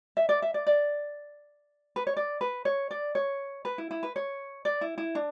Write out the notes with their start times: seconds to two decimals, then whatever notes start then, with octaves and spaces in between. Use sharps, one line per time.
0.17 E5
0.29 D5
0.42 E5
0.54 D5
0.67 D5
1.96 B4
2.07 C#5
2.17 D5
2.41 B4
2.65 C#5
2.91 D5
3.15 C#5
3.65 B4
3.78 E4
3.91 E4
4.03 B4
4.16 C#5
4.65 D5
4.81 E4
4.98 E4
5.15 D4